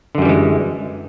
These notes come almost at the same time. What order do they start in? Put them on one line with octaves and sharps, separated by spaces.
D3 F#2 G3 E3 G#3